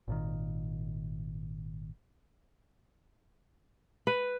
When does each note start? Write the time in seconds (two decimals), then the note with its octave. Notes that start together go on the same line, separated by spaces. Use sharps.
0.08 G#1 A#2 D#3
4.07 B4